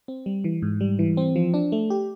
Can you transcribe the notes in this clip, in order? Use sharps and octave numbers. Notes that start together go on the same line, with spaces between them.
C4
G3
E3
G#2
G3
E3
C4
F3
D4
A3
G4